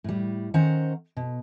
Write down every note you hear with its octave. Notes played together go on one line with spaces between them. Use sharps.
A2 G3
D#3 C#4 C5 F#5 A#5
B2